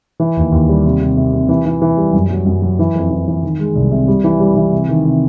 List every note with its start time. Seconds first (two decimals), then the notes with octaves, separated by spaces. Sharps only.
0.20 E3
0.37 D#2
0.52 D#2
0.69 G3
0.85 C3
1.01 C3
1.17 C3
1.33 C3
1.49 E3
1.65 E3
1.82 E3
1.97 G3
2.13 F#2
2.31 F#3
2.46 F#2
2.62 F#3
2.79 E3
2.95 F2
3.11 E3
3.28 E3
3.43 D#3
3.59 G#3
3.75 C2
3.91 C3
4.08 G3
4.24 E3
4.40 G3
4.56 E3
4.72 C3
4.89 D#3
5.04 C3